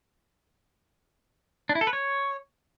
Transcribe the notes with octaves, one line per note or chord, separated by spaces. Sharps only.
D4
E4
A4
B4
C#5